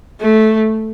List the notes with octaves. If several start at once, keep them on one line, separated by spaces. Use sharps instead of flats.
A3